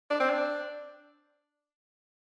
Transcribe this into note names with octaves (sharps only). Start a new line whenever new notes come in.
D4
C4
D4